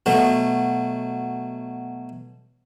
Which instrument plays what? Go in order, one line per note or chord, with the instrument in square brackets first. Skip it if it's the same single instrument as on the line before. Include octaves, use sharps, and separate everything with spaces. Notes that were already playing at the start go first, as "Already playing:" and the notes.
[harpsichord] B2 F#3 A3